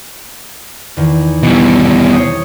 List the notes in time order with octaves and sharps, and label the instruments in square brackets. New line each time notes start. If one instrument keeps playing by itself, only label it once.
[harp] E2 D#3
[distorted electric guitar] B2 G3 [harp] E3 D7
[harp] C5 C#5 D#6